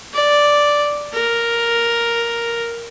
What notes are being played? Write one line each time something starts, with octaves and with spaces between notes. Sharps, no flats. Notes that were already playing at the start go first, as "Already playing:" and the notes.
D5
A#4